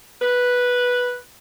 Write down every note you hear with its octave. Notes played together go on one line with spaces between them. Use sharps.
B4